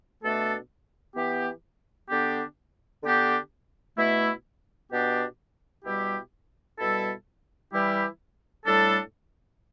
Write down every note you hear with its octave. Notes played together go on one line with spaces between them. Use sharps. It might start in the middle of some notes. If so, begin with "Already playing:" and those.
B2 A3 D4 A4
E3 B3 G4
D3 B3 D4 G4
D3 B3 D4 G4
B2 A3 E4
B2 B3 D4 G4
B2 G3 E4 G4
B2 G3 E4 A4
E3 G3 E4 G4
A2 G3 D4 A4